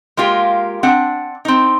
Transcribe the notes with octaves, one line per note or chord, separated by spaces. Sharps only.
G#3 A#3 F4 G4
C4 D4 F#5
C4 D#4